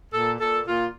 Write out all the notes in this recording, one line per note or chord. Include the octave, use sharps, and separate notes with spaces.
A#2 A4
A#2 A4
A#2 F4